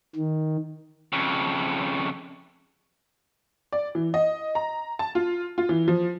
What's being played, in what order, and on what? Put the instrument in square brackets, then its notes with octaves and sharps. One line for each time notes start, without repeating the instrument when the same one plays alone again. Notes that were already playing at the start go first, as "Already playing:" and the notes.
[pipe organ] D#3
[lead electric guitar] F2 C#3
[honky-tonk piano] D5
E3
D#5
A#5
A5
F4
F4
E3
F3